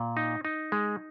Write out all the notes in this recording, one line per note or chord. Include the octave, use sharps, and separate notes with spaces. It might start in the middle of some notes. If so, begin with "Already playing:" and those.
Already playing: A#2
D#4
D#4
G#3